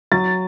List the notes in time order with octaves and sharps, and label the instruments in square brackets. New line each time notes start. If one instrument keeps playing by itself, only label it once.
[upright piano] F#3 A6